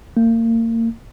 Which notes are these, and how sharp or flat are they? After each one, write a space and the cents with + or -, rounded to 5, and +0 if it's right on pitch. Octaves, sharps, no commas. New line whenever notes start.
A#3 -35